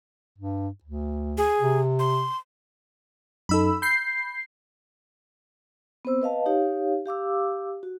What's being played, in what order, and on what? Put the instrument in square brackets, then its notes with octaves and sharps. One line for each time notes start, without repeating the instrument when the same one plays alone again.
[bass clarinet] G2
D2
[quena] G#4
[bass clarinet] C3
[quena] C6
[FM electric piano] F#2 D#4 A4 [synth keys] B5 E6
[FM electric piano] B5 [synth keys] G6 C7
[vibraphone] B3 C4 C5 E6
B4 D#5 F5 A5
D#4 G4 C#5 F5
G4 F5 D6 E6
F#4